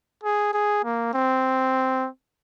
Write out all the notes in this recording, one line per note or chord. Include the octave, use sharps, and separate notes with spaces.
G#4
G#4
A#3
C4